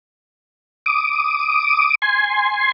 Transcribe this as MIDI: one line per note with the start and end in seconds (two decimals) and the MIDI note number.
0.86 1.95 86
0.86 1.95 87
2.02 2.72 80
2.02 2.72 84